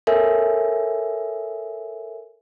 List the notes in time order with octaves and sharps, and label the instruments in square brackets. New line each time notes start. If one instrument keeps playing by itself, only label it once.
[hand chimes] A4 A#4 C#5 E5 G#5